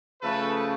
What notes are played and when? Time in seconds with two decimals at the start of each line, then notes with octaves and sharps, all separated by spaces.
0.22 C#3 F3 A3 A4 B4